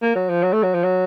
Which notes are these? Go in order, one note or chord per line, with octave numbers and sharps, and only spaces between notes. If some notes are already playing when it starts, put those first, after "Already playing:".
A#3
F#3
F3
F#3
A3
F#3
F3
F#3